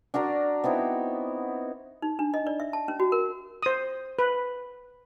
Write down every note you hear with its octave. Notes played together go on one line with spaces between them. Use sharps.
D4 F#4 A#4 D5
B3 C4 D#4 E4
D#4
D4
D#5
D5
E5
A5
C#4
F#4
A#4
C5 D#6
B4